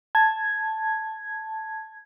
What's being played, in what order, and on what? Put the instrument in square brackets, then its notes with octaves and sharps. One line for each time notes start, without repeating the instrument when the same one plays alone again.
[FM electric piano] A5 G#6